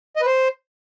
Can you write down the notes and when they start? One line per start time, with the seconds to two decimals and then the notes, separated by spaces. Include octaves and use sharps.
0.16 D#5
0.21 B4
0.26 C5